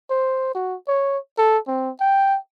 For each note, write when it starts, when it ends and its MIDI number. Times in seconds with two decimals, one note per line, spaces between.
0.10 0.52 72
0.55 0.75 66
0.88 1.18 73
1.38 1.58 69
1.67 1.90 60
2.00 2.37 79